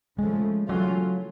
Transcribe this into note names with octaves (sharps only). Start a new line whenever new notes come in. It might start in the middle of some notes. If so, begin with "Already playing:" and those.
C#3 F3 G#3 A3
C#3 E3 F#3 A3 C#4 F4